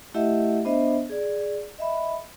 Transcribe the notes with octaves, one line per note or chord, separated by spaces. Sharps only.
A3 E4 G4 D#5 E5 F#5
B3 D4 C5 D#5 E5
G#4 D5
D#5 E5 B5